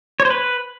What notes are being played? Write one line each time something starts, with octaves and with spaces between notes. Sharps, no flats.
C#5
C5
B4